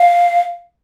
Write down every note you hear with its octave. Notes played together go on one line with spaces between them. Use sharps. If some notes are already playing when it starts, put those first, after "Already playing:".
Already playing: F5